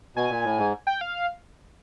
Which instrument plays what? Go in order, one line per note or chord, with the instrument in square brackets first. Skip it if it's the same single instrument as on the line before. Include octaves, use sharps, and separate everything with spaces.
[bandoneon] B2 [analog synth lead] G#5
[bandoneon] A#2
A2
G#2
[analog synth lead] G5
F5